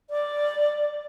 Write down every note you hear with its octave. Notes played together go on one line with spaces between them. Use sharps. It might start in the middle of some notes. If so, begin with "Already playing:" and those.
D5